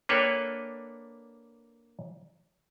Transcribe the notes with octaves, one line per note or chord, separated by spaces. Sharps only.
A#3 D4 A4 B4 C#5 G5